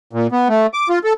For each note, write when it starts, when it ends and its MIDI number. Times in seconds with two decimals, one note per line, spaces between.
0.13 0.27 46
0.32 0.48 59
0.49 0.67 57
0.74 0.89 86
0.89 0.99 65
1.04 1.13 69